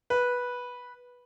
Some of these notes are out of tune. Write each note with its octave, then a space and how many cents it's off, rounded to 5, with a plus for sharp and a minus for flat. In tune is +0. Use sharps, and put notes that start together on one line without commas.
B4 -10